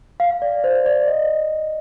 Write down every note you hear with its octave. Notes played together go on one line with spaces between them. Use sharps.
F5
D5
C5
D5
D#5